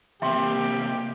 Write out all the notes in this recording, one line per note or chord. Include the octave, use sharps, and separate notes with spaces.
E2 C3 A#3 G4 E5 G5 C6